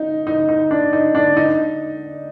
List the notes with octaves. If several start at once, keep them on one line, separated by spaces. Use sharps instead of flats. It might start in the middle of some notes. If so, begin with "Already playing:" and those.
Already playing: D#4
D#4
D#4
D4
D#4
D4
D#4